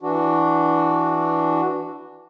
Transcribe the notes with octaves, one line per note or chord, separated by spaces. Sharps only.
E3 D4 F#4